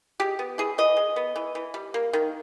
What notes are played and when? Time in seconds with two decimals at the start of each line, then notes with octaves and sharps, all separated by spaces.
0.20 G#3 G4
0.39 B3
0.58 E3 G#4
0.78 E3 D#5
0.97 G#3
1.16 B3
1.36 E3
1.55 E3
1.74 G3
1.94 A#3
2.13 D#3